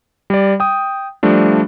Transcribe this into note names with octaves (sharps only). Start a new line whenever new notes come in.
G3 D5
G5 D#6
F3 G3 A3 D4